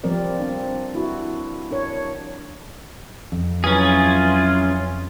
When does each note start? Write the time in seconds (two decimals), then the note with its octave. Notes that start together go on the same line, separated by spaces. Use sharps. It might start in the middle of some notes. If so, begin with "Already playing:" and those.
0.03 F3 G3 C4 A#4 D5
0.40 C4 D4
0.94 D4 E4 F#4
1.71 D4 A#4 C#5
3.32 F2
3.64 E3 F#3 C#4 F4 G#4